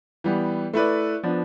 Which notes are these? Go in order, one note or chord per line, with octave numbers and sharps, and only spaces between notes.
E3 G3 B3
A3 E4 B4 D5
F3 B3 D4